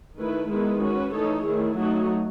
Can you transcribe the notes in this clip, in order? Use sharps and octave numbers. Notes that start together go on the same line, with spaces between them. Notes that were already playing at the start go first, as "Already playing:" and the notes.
D#3 A3 E4 B4
D#3 G#3 B3 E4 B4
C#4 F#4 B4
E3 A3 D#4 A4 C#5
D#3 A3 E4 G#4
F#3 A3 D#4 F#4